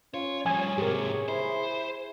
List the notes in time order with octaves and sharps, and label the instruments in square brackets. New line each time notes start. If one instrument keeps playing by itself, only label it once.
[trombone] C#4 [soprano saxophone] F4 [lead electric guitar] C#5
[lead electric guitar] F3 G3 [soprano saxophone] C#5 [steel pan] G#5
[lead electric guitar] G#2 C3 [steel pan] G4 A#4 [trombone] G#4
[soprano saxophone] E4 [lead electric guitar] C5